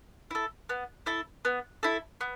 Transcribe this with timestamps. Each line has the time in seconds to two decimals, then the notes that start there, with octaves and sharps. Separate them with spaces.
0.31 E4 A4
0.69 B3
1.06 E4 A4
1.45 B3
1.83 E4 A4
2.21 B3